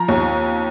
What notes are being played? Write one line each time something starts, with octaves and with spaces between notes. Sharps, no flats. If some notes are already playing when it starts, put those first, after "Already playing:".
Already playing: F3 A#5
D#2